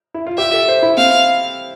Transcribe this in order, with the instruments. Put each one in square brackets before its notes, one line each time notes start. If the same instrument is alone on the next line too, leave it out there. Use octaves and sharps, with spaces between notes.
[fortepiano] E4
F4
[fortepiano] G4 [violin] E5
[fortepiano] A4
C5
E4
[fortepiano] C4 [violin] F5